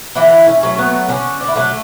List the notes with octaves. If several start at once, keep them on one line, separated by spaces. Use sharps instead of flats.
D3 E3 E4
C#4
F#3 A3
B3
D3 C#4
D4
E4
D3 F#3 A3 D4